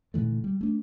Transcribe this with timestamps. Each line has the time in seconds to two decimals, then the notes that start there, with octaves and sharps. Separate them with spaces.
0.14 A#2 D3 E3 A3
0.44 G3
0.61 A3 D4